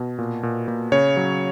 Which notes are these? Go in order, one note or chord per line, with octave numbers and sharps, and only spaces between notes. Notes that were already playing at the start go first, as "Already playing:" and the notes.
Already playing: B2
A#2
A#2
A#2
C#3 C#5
F#3